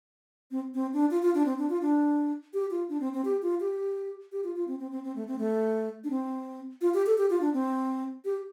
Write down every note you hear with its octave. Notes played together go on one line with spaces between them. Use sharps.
C4
C4
D4
F4
F4
D4
C4
D4
F4
D4
G4
F4
D4
C4
C4
G4
F4
G4
G4
F4
F4
C4
C4
C4
C4
A3
C4
A3
D4
C4
F4
G4
A4
G4
F4
D4
C4
G4